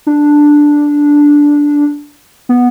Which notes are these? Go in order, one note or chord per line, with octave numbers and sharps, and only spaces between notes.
D4
B3